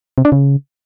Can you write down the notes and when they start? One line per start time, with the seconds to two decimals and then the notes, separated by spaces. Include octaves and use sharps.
0.18 C3
0.25 D4
0.32 C#3